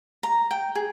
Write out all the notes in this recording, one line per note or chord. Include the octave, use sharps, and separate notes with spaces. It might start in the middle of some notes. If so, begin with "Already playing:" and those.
A#5
G5
G#4